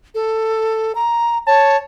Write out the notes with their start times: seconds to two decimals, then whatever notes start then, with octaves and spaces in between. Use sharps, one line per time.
0.15 A4
0.95 A#5
1.47 C#5 A5